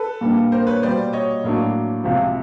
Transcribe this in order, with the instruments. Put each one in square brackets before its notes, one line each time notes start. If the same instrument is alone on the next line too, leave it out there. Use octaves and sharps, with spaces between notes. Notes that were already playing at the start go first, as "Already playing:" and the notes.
Already playing: [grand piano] A4 B4
[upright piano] A#2 G3 A#3 D4
[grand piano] A#4 C5
B4 C#5
[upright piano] B2 G3 A#3 [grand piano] C5 D5
[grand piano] C#5 D#5
[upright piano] A2 F#3 A#3 D4
C#2 C3 F3